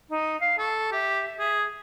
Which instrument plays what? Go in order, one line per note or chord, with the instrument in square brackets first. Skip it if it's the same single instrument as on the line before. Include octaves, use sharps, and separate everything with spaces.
[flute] D#4
F5
[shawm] A4 [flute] C#6
[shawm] G4 [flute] E5
[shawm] G#4